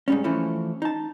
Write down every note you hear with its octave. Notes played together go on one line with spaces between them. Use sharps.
G#2 G3 C#4
E3 F3 A3 C#4 E4
D#4 A5